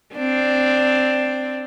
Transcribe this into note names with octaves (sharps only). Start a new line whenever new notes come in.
C4 D4